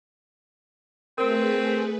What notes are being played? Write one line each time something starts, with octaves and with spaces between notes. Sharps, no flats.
A3 C4 G#4 A#4 B4